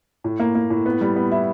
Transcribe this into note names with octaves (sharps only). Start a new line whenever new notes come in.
A2
A#3
A#3
A2
B3
G3
B3
E4